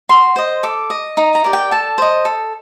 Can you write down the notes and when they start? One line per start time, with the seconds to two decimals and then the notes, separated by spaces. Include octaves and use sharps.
0.09 F#4 C6
0.36 C5 D#5
0.63 A4 D6
0.90 D#5
1.17 D#4 A#5
1.35 A#5
1.44 G4 A#4 D5
1.53 G5
1.71 A4 A5
1.98 C5 D#5
2.25 A4